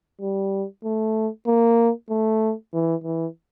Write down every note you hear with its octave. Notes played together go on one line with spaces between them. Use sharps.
G3
A3
A#3
A3
E3
E3